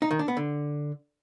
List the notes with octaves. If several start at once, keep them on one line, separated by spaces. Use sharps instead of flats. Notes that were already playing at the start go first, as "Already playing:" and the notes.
D#4
D#3
D4
B3
D3